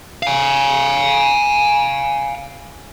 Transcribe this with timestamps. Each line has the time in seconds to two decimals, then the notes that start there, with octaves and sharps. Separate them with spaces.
0.23 F5 G#5